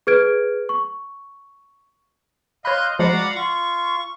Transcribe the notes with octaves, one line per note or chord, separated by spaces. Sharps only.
G#4 B4 F6 G#6 D7
C#6
C#5 D#5 F5 B5 C6 F#6 G6
F3 G#3 F#4 D5 F5 F#5 A#5 B5
F4 C#6